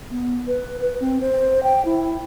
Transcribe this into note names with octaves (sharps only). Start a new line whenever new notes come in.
B3
B4
B4
C4
C5
G5
E4